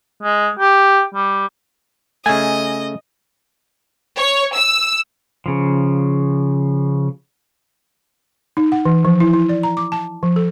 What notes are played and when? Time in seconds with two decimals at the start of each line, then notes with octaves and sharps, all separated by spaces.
0.23 G#3
0.59 G4
1.14 G3
2.26 C#3 A3 D#5 G#5
4.18 C#5
4.56 E6
5.46 C#3 F3
8.57 D#4
8.72 F#5
8.85 E3
9.05 F3
9.20 E4
9.33 E4
9.49 D5
9.63 A#5
9.77 D6
9.92 A5
10.23 F3
10.36 A4